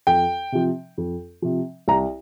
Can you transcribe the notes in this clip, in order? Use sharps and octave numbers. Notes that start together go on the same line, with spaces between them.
F2 G5
C3 F3
F2
C3 F3
C2 A#5